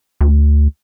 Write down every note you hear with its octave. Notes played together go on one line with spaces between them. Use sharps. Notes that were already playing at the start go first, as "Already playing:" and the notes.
D2